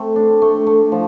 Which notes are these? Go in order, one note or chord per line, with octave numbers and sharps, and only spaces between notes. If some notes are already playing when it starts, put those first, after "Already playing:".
Already playing: A3 C4
D4
A3
A3
F3